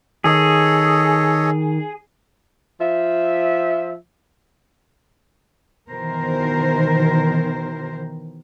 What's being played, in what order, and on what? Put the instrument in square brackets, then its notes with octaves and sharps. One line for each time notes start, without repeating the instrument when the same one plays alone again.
[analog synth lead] D#3 [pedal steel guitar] G#4 [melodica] A4 C#5 D#5
[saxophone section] F3 E5
[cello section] B2 D#3 E3 A#4 C5